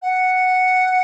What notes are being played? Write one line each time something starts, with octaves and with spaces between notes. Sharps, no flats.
F#5